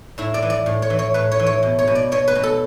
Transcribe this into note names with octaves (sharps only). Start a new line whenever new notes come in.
A2 E4
D5
E3
D5
A2
C#5
E3
C#5
A2 B4
C#5
E3
C#5
B2
C#5
B2
D5
B2 C#5
B4
B2
A4